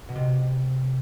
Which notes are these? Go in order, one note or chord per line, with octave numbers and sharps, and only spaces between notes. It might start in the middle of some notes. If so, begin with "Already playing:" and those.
B2
C3